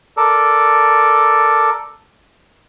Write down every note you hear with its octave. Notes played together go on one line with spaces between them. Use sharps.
A4 A#4 D5